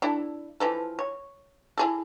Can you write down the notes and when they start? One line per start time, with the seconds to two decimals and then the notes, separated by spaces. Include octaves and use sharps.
0.02 D4 E4 A4
0.60 E3 F3 A4
0.99 C#5
1.78 E4 G#4 A4